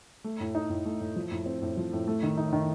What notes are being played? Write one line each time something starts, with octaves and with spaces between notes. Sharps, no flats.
A3
A2
D#4
A2
A3
A2
F3
A2
C4
A2
F3
A2
A3
D#3
D#4
D#3